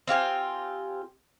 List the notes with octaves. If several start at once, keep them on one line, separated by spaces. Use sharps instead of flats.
C4 F4 G4 G#5